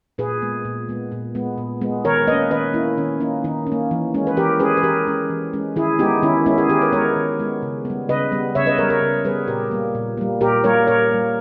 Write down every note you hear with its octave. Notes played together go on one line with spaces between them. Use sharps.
A#2 G#4 B4
G#3 B3
A#2
G#3 B3
A#2
G#3 B3
A#2
G#3 B3
D#3 A#4 C#5
A#3 C#4 B4 D#5
D#3 B4 D#5
A#3 C#4 E4
D#3 C#4
A#3 C#4 D#4
D#3 D#4
C#4
A#3
E3
G#3 C#4
B4
E3 G4 A#4
G#3 C#4 G#4 B4
B4
E3 G4 A#4
G#3 C#4
E3
G#3 C#4
D#3 E4 G#4
G#3 B3 D#4 G4
D#3 C#4 E4
G#3 B3 C#4 E4
G#4
D#3 G4 A#4
B4
G#3 B3 A#4 C#5
D#3
G#3 B3
C#3
B3
G3
C#3 B4 D#5
G3 B3
C#3 C#5 E5
B4 D#5
G3 B3 A#4 C#5
A#4 C#5
C#3
G3 B3 G#4 B4
A#2 G4 A#4
G3 A#3
A#2
G3 A#3
A#2 G4 A#4
G3 A#3 A#4 C#5
A#2 A#4 C#5
G3 A#3